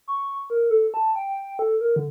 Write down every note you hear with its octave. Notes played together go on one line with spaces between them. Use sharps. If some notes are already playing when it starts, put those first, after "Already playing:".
C#6
A#4
A4
A5
G5
A4
A#4
D3